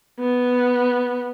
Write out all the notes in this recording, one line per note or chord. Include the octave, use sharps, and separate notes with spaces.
B3